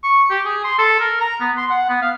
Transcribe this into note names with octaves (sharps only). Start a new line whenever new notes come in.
C#6
G4
G#4
C6
A4
A#4
A#5
B3
C6
F#5
B3
F5